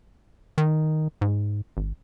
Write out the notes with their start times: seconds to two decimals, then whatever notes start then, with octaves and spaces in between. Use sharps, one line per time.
0.58 D#3
1.21 G#2
1.77 G#1